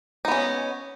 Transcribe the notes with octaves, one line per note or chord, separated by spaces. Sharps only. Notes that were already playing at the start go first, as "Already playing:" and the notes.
B3 C#4 D#4